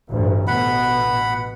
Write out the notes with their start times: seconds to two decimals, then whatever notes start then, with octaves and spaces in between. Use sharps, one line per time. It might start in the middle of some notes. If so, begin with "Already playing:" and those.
0.10 A1 D2 G2
0.47 B2 F#5 B5